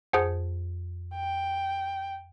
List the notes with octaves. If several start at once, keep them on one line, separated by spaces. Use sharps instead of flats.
F2 G#4 C5 F#5
G5